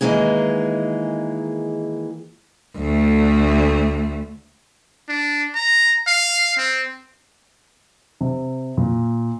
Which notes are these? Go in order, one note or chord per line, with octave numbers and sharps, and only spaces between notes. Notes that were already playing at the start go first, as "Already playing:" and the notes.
D#3 E3 G#3 A#3 G#4
D2 A3
D4
A#5
F5
C4
C3
A#2